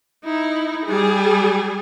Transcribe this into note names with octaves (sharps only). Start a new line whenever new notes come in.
D#4 E4
G3 G#4